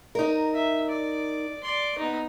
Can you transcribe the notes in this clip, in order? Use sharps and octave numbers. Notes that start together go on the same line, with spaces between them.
D#4 A#4
E5
D5
D5 C6
B3 D#4